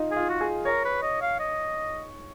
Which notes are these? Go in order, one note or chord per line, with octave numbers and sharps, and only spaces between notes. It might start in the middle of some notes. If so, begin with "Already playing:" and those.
Already playing: D#4 F4
G#4
F4
F#4
G#4
A#4 C#5
B4
D#5
F5
D#5